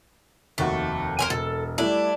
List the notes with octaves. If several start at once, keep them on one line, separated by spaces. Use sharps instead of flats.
F1 D#2 A3 F#4
A#4 C5 G#5
E1 A4
G3 A3 D4 E4